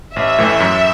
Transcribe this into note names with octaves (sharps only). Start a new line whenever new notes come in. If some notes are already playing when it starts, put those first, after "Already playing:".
A1 E5
A2 E3 A3
F#2